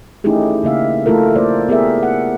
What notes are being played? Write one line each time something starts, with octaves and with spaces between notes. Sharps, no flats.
A3 C#4 D#4 E4 G4 G#4
C#3 A#3 E5 F5
A3 E4 F4 A4 A#4
A3 A#3 C5 D5
B3 G4 G#4 A#4 E5
F#5